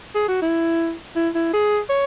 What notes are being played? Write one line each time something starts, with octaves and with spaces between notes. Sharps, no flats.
G#4
F#4
E4
E4
E4
G#4
C#5